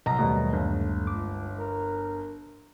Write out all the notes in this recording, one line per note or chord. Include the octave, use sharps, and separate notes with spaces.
C2 F#3 D#5 A#5
D#2 B2 G3 A3
G1
C#2 D6
A#4